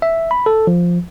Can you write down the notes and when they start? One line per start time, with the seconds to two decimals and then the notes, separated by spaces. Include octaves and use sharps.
0.02 E5
0.31 B5
0.46 A4
0.67 F3